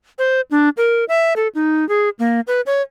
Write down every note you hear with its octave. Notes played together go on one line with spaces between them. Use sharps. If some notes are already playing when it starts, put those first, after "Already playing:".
C5
D4
A#4
E5
A4
D#4
G#4
A#3
B4
C#5